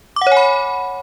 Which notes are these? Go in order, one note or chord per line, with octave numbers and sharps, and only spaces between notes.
D6
F#5
C#5
G#5
B5